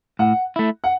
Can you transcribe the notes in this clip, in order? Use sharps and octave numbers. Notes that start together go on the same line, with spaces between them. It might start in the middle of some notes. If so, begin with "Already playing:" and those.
A2 F#5
A3 E4
F#5